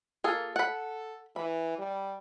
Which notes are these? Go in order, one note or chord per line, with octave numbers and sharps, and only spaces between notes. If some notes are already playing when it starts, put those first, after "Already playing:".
A#3 F4 G#4 A4
A4 F#5 B5
E3 B5
G3